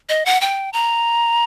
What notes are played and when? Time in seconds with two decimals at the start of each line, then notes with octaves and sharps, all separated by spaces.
0.09 D#5
0.26 F#5
0.41 G5
0.73 A#5